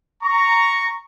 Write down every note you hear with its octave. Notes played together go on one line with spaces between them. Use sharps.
A#5 C#6